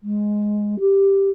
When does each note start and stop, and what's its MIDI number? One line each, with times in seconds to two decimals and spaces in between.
0.03 0.79 56
0.79 1.30 67